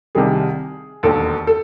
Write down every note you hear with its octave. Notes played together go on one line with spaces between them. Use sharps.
C2 C3 D#3 G3 G#4
E1 D#2 D3 A4
A4